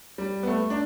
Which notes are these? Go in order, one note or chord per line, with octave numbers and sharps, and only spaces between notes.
G3
B3
A3
D4